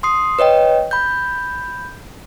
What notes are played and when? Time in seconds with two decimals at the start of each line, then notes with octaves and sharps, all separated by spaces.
0.03 C6 D#6 C7
0.39 B4 C#5 D#5 G5
0.91 B5 G6